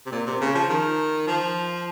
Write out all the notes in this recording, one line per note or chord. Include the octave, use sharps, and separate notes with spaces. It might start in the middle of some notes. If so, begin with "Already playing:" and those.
C3
A#2
C3
C#3
F3
D#3
F3